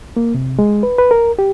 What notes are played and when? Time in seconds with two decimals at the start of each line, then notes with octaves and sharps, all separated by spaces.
0.17 A#3
0.35 C3
0.59 G#3
0.83 B4
0.98 B4
1.11 A#4
1.39 G4